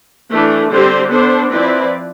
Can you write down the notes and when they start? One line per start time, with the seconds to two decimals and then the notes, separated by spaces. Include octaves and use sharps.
0.31 E3 A3 D4
0.71 D3 G3 C4 G4 C5
1.11 B3 D4 A4 C5
1.52 F3 C4 E4 B4 D5